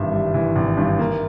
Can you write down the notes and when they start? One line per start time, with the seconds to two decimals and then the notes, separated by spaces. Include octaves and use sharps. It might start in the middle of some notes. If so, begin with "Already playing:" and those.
Already playing: G#1 G2 E3 G3 E5
0.12 G3
0.34 E3
0.56 G#1
0.77 G2
0.99 A#3